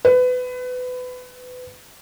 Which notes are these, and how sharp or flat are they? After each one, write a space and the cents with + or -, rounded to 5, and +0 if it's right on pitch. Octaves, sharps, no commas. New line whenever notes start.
B4 +25